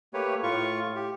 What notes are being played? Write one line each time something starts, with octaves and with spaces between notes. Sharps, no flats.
A3 A#3 G4 B4 C#5
A2 F4 C#6
G4